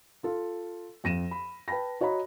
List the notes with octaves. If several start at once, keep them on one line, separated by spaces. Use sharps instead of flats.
F4 A4
F2 A#6 D#7 E7
B5
B4 G5 A5 B5 A#6
F#4 C#5 D#5 A#5 B5